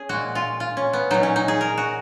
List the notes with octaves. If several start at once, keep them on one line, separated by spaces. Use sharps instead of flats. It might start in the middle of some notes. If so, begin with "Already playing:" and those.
Already playing: C#4 G#4
A#2 G#3 F#4
F4
F4
C#4
B3
A#2 F#3 D#4
C#4
D#4
G#4
A#4
F#4